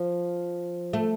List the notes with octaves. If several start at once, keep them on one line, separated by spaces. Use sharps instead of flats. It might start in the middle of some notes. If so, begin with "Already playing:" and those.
Already playing: F3
A3